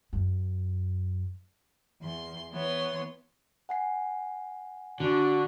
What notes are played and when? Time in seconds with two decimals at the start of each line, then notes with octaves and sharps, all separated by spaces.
0.13 F#2
2.02 E2 C6
2.52 E3 B3 C#5 C6
3.69 F#5 G#5 C7
5.00 D3 D4 F#4